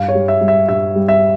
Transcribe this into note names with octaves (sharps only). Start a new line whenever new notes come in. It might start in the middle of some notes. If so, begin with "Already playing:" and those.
Already playing: G2 F5
C#5
G3
E5
G3
E5
G2 E5
G3
E5